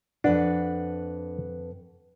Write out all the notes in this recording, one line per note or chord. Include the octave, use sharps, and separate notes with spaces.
F2 D4 B4 F#5